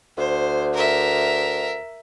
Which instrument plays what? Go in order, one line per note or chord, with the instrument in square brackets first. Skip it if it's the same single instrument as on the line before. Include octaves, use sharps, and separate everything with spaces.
[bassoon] D2 [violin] C5
[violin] A#4 E5